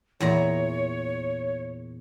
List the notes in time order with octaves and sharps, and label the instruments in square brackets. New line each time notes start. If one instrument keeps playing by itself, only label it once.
[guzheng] E2 A#2 A#5 [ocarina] C#5